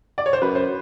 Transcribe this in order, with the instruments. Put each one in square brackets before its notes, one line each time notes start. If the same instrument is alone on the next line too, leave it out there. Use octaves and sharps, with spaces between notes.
[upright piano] D5
C#5
C5
[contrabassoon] F#2 [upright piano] B4
[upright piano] C5